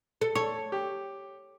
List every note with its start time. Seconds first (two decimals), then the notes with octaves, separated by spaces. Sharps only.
0.21 A4
0.35 A4 C#5
0.72 G4